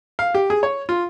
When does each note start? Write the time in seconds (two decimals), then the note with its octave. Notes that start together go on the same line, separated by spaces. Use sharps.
0.19 F5
0.34 G4
0.50 G#4
0.63 C#5
0.89 F4